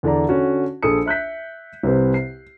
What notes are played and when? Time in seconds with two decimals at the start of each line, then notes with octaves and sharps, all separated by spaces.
0.03 E2 D3 E3 D5 A#5
0.29 D3 C#4 F#4
0.83 A#1 G#4 A4 D#6 C#7
1.06 E5 F#6 G6 B6
1.83 C2 C3 B4 C5
2.14 C7